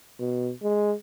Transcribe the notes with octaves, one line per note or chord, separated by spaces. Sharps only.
B2
G#3